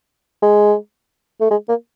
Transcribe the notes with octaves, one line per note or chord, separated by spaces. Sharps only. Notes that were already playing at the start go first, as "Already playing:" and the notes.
G#3
A3
G#3
A#3